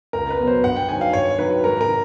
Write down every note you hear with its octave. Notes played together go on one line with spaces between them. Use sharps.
C#2 A#4
B4
B2 F#3
C5
G2 F#5
G5
D#3 F#3 G#5
F5
G2 C#5
D#3 F#3 B4
G#2 A#4
A#4
D#3